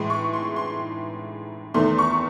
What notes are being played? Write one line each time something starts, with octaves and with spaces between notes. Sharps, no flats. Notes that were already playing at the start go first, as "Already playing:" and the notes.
Already playing: A2 E3 G#3 C6
C#6
C6
C6
E2 D#3 A3 C6
C#6